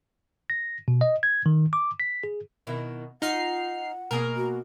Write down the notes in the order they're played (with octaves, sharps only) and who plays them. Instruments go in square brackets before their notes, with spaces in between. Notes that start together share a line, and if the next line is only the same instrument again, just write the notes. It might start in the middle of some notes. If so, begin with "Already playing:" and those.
[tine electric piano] A#6
B2
D#5
G#6
D#3
D6
B6
G#4
[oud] B2 D#3 E4
[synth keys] D#4 F6 C7 [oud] F4 [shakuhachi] F#5
[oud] B2 A#3 G#4 [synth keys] A#4
[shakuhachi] F#4